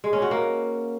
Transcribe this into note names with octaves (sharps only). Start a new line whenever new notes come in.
G#3
C#4
F#4
A#3